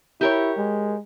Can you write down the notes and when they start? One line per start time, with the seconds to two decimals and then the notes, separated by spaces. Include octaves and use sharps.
0.21 E4 G4 A#4 C#5
0.58 G#3